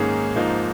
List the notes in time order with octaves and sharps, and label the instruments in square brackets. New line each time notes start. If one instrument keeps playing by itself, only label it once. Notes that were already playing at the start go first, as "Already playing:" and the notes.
Already playing: [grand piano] G#2 D#3 A#3 C#4 G#4
G#2 F3 A#3 D#4